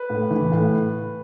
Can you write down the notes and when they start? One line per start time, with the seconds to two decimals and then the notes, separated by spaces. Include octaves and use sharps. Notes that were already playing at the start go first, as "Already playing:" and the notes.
Already playing: B4
0.10 A2
0.31 E3
0.52 A2